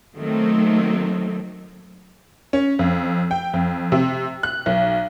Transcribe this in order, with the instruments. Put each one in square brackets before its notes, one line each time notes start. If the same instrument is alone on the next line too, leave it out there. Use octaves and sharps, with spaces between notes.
[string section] D#3 F#3 A3 A#3 C4
[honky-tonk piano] C#4
F2
G5
F2
C3
F#6
B1